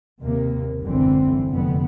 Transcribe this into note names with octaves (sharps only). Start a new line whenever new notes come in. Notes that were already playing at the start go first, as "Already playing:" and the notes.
D#2 C3 A#3
F#1 B1 G#2 D3 E3 C4
F1 F2 D3 B3